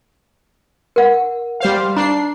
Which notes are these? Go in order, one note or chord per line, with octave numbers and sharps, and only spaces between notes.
A#4 F#5
G3 C5 F5
D4 A#5 C7